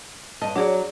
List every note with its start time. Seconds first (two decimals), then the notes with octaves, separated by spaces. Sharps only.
0.42 G2 D#5 A5
0.56 F#3 D4 F#4 G#4 D5